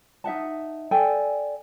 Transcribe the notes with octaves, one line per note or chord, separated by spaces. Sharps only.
D#4 E5 F#5 A5
A4 D5 G5 G#5